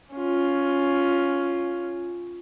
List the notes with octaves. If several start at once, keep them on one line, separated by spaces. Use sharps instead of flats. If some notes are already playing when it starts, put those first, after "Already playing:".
C#4 F4